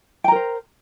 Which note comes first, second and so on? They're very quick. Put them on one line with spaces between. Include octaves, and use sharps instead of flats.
G5 A#5 A#4 C5